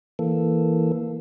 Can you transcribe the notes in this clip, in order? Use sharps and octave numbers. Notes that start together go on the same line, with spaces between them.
E3 A#3 A4